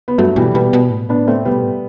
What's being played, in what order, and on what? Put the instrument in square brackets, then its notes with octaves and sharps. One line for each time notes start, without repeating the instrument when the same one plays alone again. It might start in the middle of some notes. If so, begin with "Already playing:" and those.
[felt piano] B3
[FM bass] G2 [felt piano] F#3 A3
[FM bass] B2 [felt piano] E3 G3
[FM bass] B2 [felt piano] G3 B3
[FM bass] B2
A2
[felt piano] B3 D4
A3 C4
[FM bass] C3 [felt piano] G3 B3
[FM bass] B2
A2